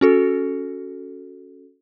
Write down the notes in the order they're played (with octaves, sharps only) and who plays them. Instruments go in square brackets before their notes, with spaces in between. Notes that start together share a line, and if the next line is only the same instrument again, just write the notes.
[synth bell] C#4 F#4 A4